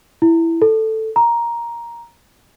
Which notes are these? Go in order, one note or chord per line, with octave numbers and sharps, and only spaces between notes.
E4
A4
A#5